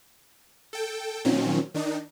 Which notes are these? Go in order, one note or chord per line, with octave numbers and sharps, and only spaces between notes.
A4 G5
A#2 D#3 F3 F#3 C4 C#4
D#3 D4 D#4